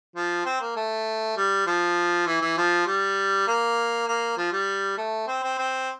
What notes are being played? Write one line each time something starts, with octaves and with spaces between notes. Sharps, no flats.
F3
C4
A#3
A3
G3
F3
E3
E3
F3
G3
A#3
A#3
F3
G3
A3
C4
C4
C4